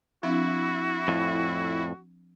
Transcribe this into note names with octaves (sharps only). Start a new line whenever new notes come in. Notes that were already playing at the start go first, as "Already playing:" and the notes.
F3 C4 D4 E4 F#4
F2 A2